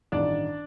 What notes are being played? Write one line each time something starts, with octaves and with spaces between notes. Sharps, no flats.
A1 G2 D#3 D4 D5